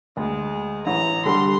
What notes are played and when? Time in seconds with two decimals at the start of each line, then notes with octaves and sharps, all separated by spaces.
0.17 D2 G#3
0.87 A1 A#5
1.25 D3 G3 A4 C6